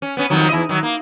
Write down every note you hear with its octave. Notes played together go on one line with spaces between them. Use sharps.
C#4
B3 C#4
F2 D#3 F#3
E2 E4 D#5
D#3 F#3
A#3